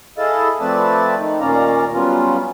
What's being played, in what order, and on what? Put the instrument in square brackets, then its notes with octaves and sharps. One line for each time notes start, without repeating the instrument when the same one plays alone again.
[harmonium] E4 G#4 A4 D#5 F5 A5
F3 A3 C4 B4 D5 A5
D#3
D#2 A#2 C#4 D5 F5 A#5
F#3 G3 B3 C#4 F4